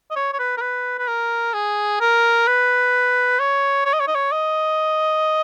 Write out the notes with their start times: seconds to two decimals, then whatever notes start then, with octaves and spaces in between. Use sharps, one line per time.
0.10 D#5
0.16 C#5
0.33 C#5
0.39 B4
0.57 A#4
0.61 B4
0.99 B4
1.08 A#4
1.53 G#4
2.00 A#4
2.47 B4
3.39 C#5
3.85 C#5
3.93 D#5
4.00 C#5
4.07 D#5
4.15 C#5
4.32 D#5